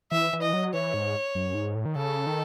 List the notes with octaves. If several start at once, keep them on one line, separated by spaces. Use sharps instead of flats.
E3 E5
E3
D#5
F#3
E3 C#5
G#2
F#2
G#2
A2
D#3
C#3 A4
D#3